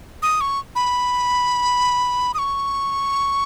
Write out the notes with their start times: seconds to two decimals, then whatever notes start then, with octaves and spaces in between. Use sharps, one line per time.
0.22 D#6
0.41 C#6
0.75 B5
2.34 D#6
2.38 C#6